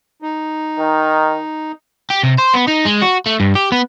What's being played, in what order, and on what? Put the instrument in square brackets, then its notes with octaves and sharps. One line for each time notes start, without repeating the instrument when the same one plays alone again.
[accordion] D#4
[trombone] D#3
[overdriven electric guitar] G4
C3
C5
B3
D#4
G#3
F#4
A3
G2
G4
B3